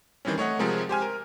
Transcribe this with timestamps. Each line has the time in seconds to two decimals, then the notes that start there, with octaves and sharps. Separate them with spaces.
0.25 D#3 E3 G3 C4 C#4
0.38 A3 C#5 D#5 F#5
0.59 C3 F3 G#3 C4 G#4 A#4
0.89 G4 C5 G#5 F6
1.02 A#4